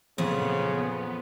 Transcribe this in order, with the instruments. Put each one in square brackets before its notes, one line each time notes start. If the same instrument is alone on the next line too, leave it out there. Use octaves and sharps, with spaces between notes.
[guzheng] F2 [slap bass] A#2 E3 F#3 [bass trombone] C#3 [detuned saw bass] B3